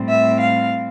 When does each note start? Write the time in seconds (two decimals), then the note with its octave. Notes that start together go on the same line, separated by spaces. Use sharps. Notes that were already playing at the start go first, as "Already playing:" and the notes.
Already playing: A2 G3 C4
0.08 E5
0.39 F5